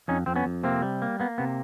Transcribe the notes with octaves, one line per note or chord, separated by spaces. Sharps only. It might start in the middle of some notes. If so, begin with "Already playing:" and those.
F2 C#4 D#4
F2 C4
B3 C#4
F2
C3 A#3 C4
G3
A#3
A#3 B3
C3 B3